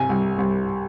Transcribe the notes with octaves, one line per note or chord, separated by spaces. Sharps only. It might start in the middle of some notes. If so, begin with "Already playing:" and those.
Already playing: C3 G#5
C2
C2